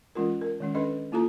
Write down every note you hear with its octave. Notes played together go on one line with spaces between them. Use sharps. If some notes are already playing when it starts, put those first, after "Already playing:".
E3 G#3 C#4 F4 A#4
A#4
D#3 G#3 C#4
C#4 D4 A4 B4 D#5
A#3 E4 F4 A4 A#5